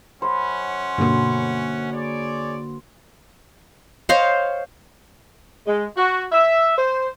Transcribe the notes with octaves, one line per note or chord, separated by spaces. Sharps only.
F#2 C#4 C5 F#5 B5
G2 B2 D3 A#3 F#4
G#4 C#5 D5
C5 C#5 D#5 F5
G#3
F#4
E5
C5